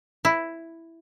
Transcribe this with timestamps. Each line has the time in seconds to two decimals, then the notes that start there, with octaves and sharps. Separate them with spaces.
0.25 E4